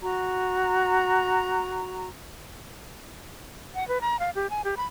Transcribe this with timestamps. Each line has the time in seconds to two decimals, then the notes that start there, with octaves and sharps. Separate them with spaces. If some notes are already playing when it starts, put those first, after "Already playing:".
0.01 F#4 A#5
3.75 F#5
3.88 B4
4.01 A#5
4.19 F5
4.35 G4
4.50 G#5
4.64 G4
4.77 B5